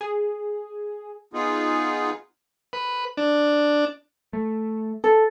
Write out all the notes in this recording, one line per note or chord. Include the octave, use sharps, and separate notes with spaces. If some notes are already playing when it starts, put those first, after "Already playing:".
G#4
B3 D#4 F4 G#4
B4
D4
A3
A4